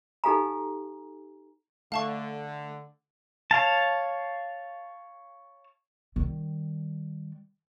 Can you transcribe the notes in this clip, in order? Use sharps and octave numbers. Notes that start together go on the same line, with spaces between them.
D#4 G4 A4 F5 G#5 A#5
D3 A3 F5 A5 C#6
C#5 F5 A5
D#3 G3